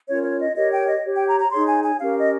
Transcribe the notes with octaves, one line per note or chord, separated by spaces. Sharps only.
C#4 F4 A#4 C#5
C#5
D#5
G4 A#4 C#5 D#5
G5
D#5
G4 C#5
G5
A#5
A#5
D#4 G#4 C#5 C6
G#5
G#5
C#4 G4 A#4 F5
D#5